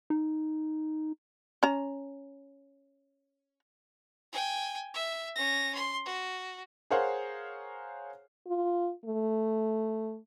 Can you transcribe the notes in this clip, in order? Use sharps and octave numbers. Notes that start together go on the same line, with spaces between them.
D#4
C#4 A#5
G5 G#5
E5
C#4 A#6
C6
F#4
G#4 A#4 C5 C#5 F5 F#5
F4
A3